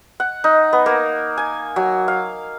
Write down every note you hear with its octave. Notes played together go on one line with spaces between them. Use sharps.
F#5
D#4
B3
A#3
G#5
F#3
F5